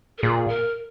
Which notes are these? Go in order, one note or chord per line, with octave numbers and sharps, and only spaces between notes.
A#4
A#2 G#4
A#4